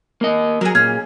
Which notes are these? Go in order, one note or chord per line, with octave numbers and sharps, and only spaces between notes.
A#3 D#5
F#3 G#4 A#4
A#2 C#4 G#4 F6